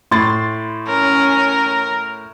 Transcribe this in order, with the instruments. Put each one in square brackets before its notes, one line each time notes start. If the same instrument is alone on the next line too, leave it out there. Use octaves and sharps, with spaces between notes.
[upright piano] A2 [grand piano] C6 A6
[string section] C#4 [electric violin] A#4